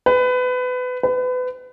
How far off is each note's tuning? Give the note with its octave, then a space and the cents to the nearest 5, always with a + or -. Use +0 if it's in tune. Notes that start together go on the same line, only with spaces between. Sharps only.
B4 +25
B4 +30